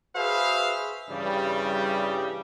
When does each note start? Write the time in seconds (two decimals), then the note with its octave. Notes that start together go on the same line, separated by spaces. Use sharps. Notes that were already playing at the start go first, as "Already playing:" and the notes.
0.15 F#4 G#4 B4 C5 E5 F5
1.10 G2 C#3 E3 G3